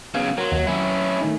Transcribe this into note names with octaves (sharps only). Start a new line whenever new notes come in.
B1 C#3 B3 F5
F#3 A#4 C6
D#2
F#3 C#4 E4
D#3 A3 D#4